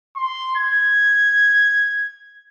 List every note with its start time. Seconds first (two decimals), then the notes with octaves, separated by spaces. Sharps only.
0.16 C6
0.57 G#6